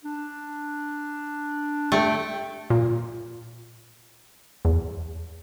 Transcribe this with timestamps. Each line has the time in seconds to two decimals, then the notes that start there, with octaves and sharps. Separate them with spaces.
0.04 D4
1.92 A3 G5
2.70 A#2
4.65 E2